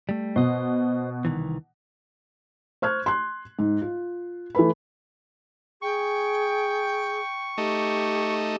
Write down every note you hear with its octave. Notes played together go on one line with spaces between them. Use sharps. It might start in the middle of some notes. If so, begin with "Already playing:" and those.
G3 A3
B2 C5 D#5
C2 D#3 E3
C5 C#6 F6 F#6 G#6
C6 F#6
G#2
F4
E3 A3 B4 B5
G#4 G5 C#6
A3 D#4 G4